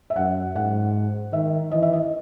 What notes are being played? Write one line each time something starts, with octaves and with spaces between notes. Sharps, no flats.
E5
F#2 F#5
G#2 F#5
D#3 E5
E3 D#5
E5
D#5